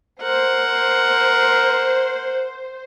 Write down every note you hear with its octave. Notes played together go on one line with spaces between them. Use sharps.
A#4 C5 F#5